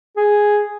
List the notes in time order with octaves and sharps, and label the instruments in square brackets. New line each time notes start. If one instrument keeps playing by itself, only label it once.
[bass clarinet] G#4